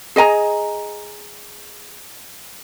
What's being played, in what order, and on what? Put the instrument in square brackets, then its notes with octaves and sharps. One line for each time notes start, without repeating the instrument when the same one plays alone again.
[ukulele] G#4 D#5 G#5 A#5